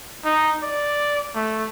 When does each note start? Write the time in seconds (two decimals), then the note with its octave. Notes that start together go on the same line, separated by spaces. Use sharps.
0.24 D#4
0.63 D5
1.35 A3